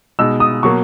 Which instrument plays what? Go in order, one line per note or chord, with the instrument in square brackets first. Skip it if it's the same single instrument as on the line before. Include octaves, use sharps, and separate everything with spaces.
[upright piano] B2 G#3 D#4 E6
D#6
B2 F#3 A#3 C#6